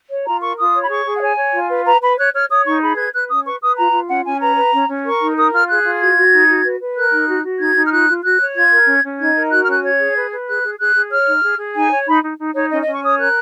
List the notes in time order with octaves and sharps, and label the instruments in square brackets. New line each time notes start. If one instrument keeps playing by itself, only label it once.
[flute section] C#5
F4 A#5
A#4 C#6
F4 D#6
C#5
B5
G#4 C#6
G#4
F#5
C#5 G#5
C#5
F4
B4
B4 A#5
B4 B5
C#5 F#6
C#5 F6
C#5 D#6
D#4 C#6
G#4 B5
B4 G#6
B4 F#6
C#4 D#6
B4 C#6
B4 D#6
F4 A#5
F4
C#4 F#5
C#4 G#5
B4 A#5
B4
C#4
C#4
A#4 C#6
D#4
A#4 D#6
F4 F6
G#4 F#6
F4
F#4 G#6
F#4
D#4
F#4
B4
B4
A#4 F#6
D#4
F#4
F#4
D#4 G#6
D#4
F6
F4 F#6
F4
F#4 F#6
C#5
F4 G#6
A#4
C#4
C#4
D#4 G#6
A#4
F#4 F#6
F6
C#4 F#6
C#5 G#6
G#4
B4
B4
G#4 F#6
G#4
G#4 F#6
G#4
C#5 F6
D#4
G#4
G#4
D#4 G#5
C#5
D#4 B5
D#4
D#4
D#4 C#5
C#4 D#5
D#5
C#4 C#6
C#5 D#6
A#4 F#6